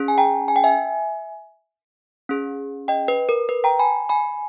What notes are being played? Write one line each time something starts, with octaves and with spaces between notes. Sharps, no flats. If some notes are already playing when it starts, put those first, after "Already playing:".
Already playing: C#4 G#4
G#5
G5 A#5
G#5
G5
E5 G#5
C#4 G#4
D#5 G5
B4
A#4
B4
G5 A#5
G#5 B5
G#5 B5